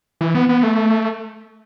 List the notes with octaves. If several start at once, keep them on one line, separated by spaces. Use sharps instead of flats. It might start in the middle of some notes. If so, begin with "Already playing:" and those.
E3
B3
B3
A3